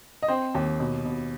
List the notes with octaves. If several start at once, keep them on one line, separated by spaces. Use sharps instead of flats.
D#5
C4 C5
D#2
B2
B2